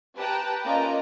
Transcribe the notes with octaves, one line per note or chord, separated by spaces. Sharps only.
G4 B4 G5 A5 A#5 F#6
A#3 C#4 F4 D5 D#5 A#5